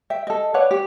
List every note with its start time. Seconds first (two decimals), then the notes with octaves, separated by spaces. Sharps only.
0.10 E5 G5
0.27 A4 D#5
0.54 B4 C#5 D5 F#5
0.71 G4